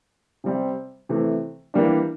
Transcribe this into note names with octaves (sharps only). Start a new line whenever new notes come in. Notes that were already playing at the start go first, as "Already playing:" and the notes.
C3 G3 C4
C3 E3 A3
E3 G3 A#3 D4